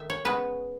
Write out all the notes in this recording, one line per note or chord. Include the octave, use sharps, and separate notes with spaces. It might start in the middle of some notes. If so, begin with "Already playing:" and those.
Already playing: D#3 A3 E5
C#5
C#3 G#3 B3 B4